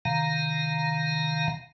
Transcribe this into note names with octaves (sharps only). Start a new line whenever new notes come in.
C3 D#3 F5 A#5